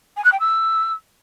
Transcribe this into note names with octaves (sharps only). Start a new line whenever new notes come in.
G#5
F#6
G5
E6